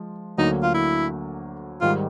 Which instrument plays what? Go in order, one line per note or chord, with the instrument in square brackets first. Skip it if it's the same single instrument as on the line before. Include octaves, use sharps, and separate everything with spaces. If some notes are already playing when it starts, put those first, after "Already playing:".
Already playing: [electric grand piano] F3 G#3
[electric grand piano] D2 D3 F#3 A#3 [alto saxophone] D#4
[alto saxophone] F4
E4
[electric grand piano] G#2 D#3 G3 [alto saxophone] F4